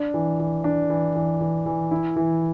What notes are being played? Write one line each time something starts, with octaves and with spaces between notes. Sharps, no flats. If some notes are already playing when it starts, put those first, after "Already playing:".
Already playing: D4
E3
E3
D4
E3
E3
E3
E3
E4
E3